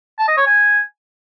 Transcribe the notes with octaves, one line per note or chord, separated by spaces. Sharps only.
A5
D#5
C#5
G#5